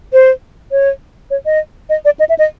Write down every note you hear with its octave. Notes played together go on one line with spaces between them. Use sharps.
C5
C#5
C#5
D#5
D#5
D5
D#5
E5
D#5